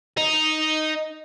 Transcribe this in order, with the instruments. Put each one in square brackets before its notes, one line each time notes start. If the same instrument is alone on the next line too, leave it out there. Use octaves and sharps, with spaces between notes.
[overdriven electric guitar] D#4